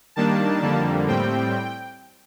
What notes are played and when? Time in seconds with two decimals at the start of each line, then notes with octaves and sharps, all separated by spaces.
0.16 D#3 G3 A#3 D4 A5
0.62 F2 D3 G3 A#3
1.08 A2 G3 C4 G5